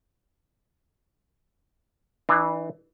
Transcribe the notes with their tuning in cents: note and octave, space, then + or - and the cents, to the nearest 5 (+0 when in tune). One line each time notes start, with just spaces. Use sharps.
E3 -10 D4 +40